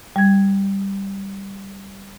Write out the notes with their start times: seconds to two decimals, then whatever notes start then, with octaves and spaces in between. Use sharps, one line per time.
0.16 G3 G#6